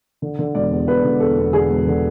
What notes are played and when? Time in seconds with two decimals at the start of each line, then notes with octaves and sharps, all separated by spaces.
0.22 D3
0.39 D3
0.55 E1 D5
0.71 E2
0.88 E2 B4
1.04 D3
1.20 E2 A4
1.38 E2
1.53 D3 G#4
1.70 E1
1.87 D3